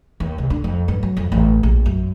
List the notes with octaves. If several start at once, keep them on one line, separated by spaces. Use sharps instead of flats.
D#2
C2
D3
F2
G2
F#3
F2
A1
A#1
F#2